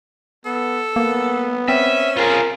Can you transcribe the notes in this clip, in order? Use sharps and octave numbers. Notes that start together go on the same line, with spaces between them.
B3 A4
A#3 B3
C4 C#4 E5
F4 G#4 A#4